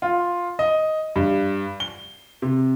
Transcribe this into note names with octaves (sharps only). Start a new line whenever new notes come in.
F4
D#5
G2
G7
C3